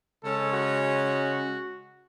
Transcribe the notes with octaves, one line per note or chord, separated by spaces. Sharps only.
C#3 G#3 C#4 A4
F#4
F#4